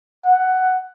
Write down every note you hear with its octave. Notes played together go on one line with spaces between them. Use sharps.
F#5